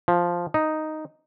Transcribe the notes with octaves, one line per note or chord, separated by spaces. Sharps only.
F3
D#4